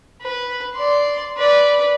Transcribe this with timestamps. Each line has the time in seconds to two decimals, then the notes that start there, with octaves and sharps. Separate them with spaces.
0.22 B4
0.75 D5 C6
1.38 B4 D5